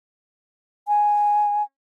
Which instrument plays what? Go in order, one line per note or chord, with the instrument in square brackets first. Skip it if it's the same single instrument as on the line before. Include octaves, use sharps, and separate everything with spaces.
[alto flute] G#5